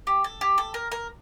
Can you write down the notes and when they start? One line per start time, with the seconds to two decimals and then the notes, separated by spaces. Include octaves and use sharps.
0.07 G4
0.24 A4
0.41 G4
0.58 A4
0.74 A#4
0.92 A#4